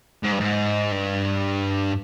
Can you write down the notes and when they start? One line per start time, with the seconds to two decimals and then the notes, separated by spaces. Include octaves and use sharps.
0.23 G#2
0.32 G2
0.40 G#2
0.92 G2